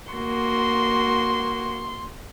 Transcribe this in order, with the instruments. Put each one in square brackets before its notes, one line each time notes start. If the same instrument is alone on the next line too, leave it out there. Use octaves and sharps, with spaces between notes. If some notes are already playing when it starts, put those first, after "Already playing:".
[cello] A#3 F#4 [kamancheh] C6